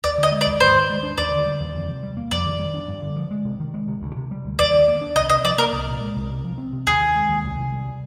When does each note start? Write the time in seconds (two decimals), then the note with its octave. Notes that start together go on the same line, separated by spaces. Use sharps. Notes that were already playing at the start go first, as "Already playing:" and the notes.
0.04 D#2 D5
0.18 D3
0.23 D#5
0.32 G#3
0.41 D5
0.46 D#2
0.60 G#2 C5
0.75 D#3
0.89 G#3
1.03 D4
1.18 D#2 D5
1.31 D3
1.46 G3
1.60 D#2
1.74 F2
1.89 C3
2.03 G3
2.17 A#3
2.31 F2 D5
2.46 D#3
2.59 G3
2.74 D4
2.88 G2
3.02 D3
3.16 F3
3.31 G#3
3.45 C3
3.60 D#3
3.74 G#3
3.88 C3
4.01 D2
4.16 C3
4.31 G3
4.45 D2
4.59 D#2 D5
4.72 D#3
4.88 A#3
5.01 D4
5.15 C2 D#5
5.29 C3 D#5
5.44 F3 D5
5.58 A#3 A#4
5.72 C2
5.87 A#2
6.01 G#3
6.16 C2
6.30 C3
6.44 F3
6.58 C4
6.73 C3
6.87 D#2 G#4
7.01 D#3
7.15 G#3
7.29 D#2
7.44 C2
7.57 C3
7.72 G3